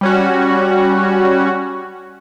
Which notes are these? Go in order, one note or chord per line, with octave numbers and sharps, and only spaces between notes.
G3 C#4 F#4